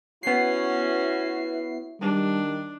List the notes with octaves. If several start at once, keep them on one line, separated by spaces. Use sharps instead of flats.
B3 C#4 E4 F#4 C7
D#3 G3 D4